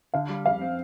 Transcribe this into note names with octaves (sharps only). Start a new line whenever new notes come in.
D3 F5
G3
F2 F5
C4